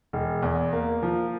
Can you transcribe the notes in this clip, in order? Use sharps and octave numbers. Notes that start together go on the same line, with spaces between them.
E1
E2
A#3
F3